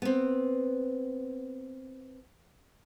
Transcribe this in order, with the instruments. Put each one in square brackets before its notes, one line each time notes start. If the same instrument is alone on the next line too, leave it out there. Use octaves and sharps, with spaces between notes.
[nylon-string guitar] B3 C4